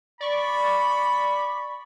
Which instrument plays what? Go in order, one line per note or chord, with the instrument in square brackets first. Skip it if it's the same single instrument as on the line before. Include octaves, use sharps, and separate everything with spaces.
[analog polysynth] D5 C#6 [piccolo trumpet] B5